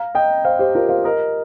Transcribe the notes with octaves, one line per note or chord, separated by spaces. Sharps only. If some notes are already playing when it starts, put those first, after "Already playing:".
Already playing: F5 A#5
D#5 G5
C5 F5
G4 C5
F4 A#4
C5 F5
A#4 D#5